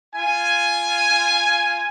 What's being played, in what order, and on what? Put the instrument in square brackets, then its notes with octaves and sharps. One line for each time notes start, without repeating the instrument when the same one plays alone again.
[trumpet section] F4 G#5